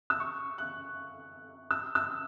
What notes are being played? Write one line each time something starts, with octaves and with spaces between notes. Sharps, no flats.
E6
C#6
F#6
E6
E6